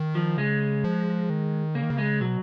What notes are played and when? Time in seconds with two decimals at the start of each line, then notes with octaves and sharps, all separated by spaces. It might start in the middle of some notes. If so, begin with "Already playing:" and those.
Already playing: D#3
0.15 F3
0.37 C#3 G#3
0.84 F3
1.30 D#3
1.75 C#3 A#3
1.83 D#3
1.90 C#3
1.98 G#3
2.21 B2 F#3